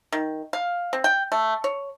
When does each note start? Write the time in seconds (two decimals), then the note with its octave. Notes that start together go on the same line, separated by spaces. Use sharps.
0.12 D#3
0.53 F5
0.93 C4
1.04 G5
1.32 A3
1.64 C#5